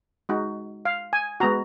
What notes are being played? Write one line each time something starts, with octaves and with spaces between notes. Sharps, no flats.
G#3 D#4 F#4
F5
G#5
G#3 B3 F#4 A#5